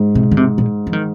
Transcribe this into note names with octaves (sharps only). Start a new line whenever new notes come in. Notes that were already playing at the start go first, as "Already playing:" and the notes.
Already playing: G#2
C3
D3
C3
A#2
F3
D#3